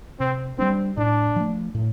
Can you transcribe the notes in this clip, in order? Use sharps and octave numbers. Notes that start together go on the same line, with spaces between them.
C3 C4
G3 B3 C4 D4
A2 D4
F3 A3
A2